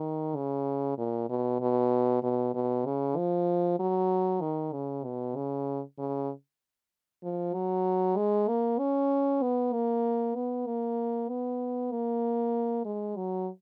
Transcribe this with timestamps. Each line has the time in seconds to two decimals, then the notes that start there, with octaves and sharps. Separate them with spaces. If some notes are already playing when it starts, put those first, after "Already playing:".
Already playing: D#3
0.36 C#3
0.98 A#2
1.30 B2
1.60 B2
2.23 B2
2.54 B2
2.86 C#3
3.17 F3
3.80 F#3
4.41 D#3
4.73 C#3
5.05 B2
5.36 C#3
5.98 C#3
7.23 F3
7.54 F#3
8.17 G#3
8.48 A#3
8.79 C#4
9.42 B3
9.73 A#3
10.36 B3
10.67 A#3
11.29 B3
11.92 A#3
12.85 G#3
13.17 F#3